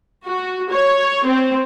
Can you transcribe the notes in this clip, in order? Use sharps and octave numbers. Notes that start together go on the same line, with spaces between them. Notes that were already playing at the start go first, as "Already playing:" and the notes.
F#4
C#5
C4